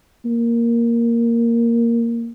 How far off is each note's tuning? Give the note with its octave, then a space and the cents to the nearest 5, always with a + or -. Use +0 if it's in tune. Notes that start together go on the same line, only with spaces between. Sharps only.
A#3 +0